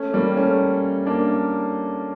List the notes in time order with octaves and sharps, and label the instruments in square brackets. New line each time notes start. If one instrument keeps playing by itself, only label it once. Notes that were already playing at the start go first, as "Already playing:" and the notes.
Already playing: [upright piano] A3 C#4
G3 A#3
A3 C#4
A#3 D4